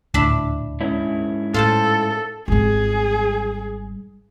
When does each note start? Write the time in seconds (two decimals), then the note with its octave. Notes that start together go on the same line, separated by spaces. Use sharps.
0.14 D#1 D2 A2 D4 E5 B5
0.81 G#2 C#4 E4
1.54 A2 F4 A4 C5 A5
2.48 G#1 G3 G#4